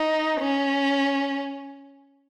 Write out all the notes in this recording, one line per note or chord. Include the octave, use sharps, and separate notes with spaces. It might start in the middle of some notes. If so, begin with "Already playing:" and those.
Already playing: D#4
C#4